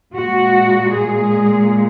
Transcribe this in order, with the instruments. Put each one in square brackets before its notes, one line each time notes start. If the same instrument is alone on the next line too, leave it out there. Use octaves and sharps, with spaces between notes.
[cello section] A#2 G#3 F#4
G#4